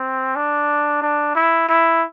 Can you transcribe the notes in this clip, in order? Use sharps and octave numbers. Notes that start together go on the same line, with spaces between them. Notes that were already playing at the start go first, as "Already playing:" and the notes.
Already playing: C4
D4
D4
E4
E4